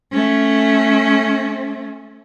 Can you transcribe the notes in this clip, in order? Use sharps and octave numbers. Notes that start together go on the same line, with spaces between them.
A3 C#4